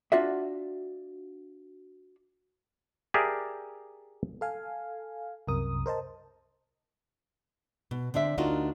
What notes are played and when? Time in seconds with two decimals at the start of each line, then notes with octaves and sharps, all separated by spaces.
0.12 D4 F4 F#4 D5 E5
3.14 G4 G#4 A#4 D5 E5 A5
4.41 A4 F5 G#5
5.47 C2 F#2 C3 A#4 D#6
5.86 A#4 C5 D#5 A5
7.91 B2
8.14 D3 C4 D4 E5
8.38 D2 D4 D#4 F4 F#4 A#4